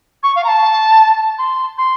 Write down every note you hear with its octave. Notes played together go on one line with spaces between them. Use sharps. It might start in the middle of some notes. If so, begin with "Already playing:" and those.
C#6
F5
A#5
A5
C6
C6